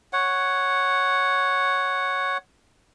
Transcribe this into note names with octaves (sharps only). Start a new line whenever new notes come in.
C#5 F#5